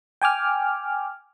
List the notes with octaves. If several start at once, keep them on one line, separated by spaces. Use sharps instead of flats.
G5 G#5 D6 F6